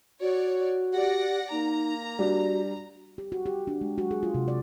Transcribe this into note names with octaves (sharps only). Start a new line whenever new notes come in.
F#4 C#5 D5
G4 D5 F#5 A#6
A#3 D#4 A#5
G3 D4 F#4
G4
F#4
G4
D4
G#3
F#4
G#4
F4
C3
D5